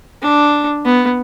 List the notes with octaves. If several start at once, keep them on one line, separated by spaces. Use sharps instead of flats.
D4
B3